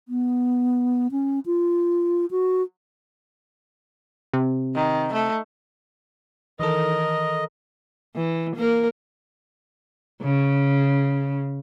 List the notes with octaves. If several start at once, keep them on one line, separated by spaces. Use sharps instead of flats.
B3
C#4
F4
F#4
C3
D#3
A3
D#3 E3 A4 A#4 D#5
E3
A#3 A#4
C#3